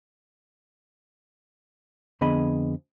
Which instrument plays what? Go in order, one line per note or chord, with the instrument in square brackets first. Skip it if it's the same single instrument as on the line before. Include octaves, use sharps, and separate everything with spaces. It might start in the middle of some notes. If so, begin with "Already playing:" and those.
[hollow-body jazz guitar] F2 D3 B3 G#4 D#5 B5